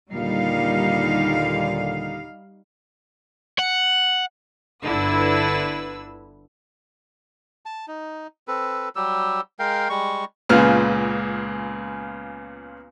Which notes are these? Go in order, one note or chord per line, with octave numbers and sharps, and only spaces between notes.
D#2 A#2 D3 G3 D#4 F5
F#5
G1 D3 E4 B4 E6
A5
D#4
C4 A4 B4
F#3 G3 G4 E6
G#3 A#4 F5 G5
G3 G#3 C#6
C#2 A#2 C#3 B3 F6